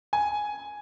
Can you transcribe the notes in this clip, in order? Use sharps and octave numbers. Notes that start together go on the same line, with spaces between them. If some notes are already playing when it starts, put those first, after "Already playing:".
G#5